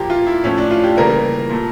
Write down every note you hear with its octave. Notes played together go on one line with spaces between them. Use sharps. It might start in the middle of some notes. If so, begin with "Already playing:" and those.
Already playing: A#2 F3 A#3 G4
F4
E4
A2 F3 A3 C#4
D4
F4
G4
C#3 E3 G3 A#3 A#4
A#2 A3